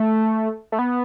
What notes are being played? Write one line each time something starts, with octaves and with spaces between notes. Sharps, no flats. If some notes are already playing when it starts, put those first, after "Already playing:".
Already playing: A3
A3
B3